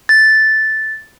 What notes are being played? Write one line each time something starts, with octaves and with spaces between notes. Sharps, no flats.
A6